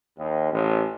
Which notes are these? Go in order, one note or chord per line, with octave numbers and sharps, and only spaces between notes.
D#2
A1